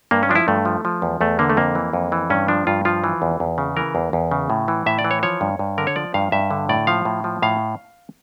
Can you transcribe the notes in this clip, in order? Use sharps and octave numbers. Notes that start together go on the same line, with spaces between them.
G2 A#3
C#4
F3 D4
E4
G2 A3
F3
F3
E2
E2 A3
D3 A#3
A3
F2 A#3
E3
F2
E3
G2 C#4
F3 D4
G2 F4
F3 F4
E3
E2
E2
C#3
E3 A#4
E2
E2
C#3
A2
E3
A2 E5
D5
E3
C#5
F3 C#5
G2
G2
D3 A#4
C#5
F3 D5
G2 F5
G2 E5
D3
A2 D5
F3 F5
A2
F3
A2 F5